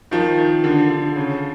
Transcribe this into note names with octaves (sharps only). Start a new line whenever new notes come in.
D#3 F3
D#3
D3
D3
C#3